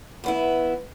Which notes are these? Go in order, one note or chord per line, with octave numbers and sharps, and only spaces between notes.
E2 B3 E4